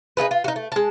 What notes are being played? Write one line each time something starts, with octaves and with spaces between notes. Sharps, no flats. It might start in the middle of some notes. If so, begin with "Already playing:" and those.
D#4 F4 G#4 B4
F4
D#4 F#4
A3
G#3 A5